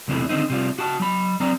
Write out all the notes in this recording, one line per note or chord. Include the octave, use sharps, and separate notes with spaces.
B1 E2 C3 E3 A3
D3 D#3 A#3 C4 D#4
C3 G3 F4
F#4 G5 A5
F#3 B5
F#3 C4 D4 D5 A#5